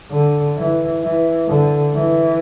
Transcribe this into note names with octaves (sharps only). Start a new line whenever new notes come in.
D3
E3
E3
D3
E3